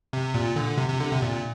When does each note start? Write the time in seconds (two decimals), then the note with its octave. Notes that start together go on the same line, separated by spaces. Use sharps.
0.13 C3
0.34 A#2
0.56 D3
0.78 C3
0.89 C3
1.01 D3
1.11 C3
1.22 A#2